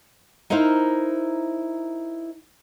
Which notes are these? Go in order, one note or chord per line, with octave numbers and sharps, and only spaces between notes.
D#4 E4 A#4 C5 F5